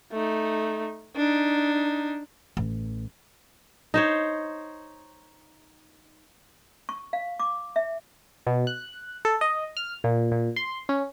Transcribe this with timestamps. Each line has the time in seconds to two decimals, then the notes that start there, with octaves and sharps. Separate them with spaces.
0.12 A3 D#4
1.16 D4 D#4
2.57 A1
3.94 D#4 C5 C#5
6.89 C#6
7.13 F5
7.40 D6
7.76 E5
8.47 B2
8.67 F#6
9.25 A4
9.41 D#5
9.77 F6
10.04 A#2
10.32 A#2
10.56 C6
10.89 C#4